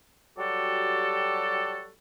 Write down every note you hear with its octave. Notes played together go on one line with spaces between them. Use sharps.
F#3 G3 F#4 G4 A4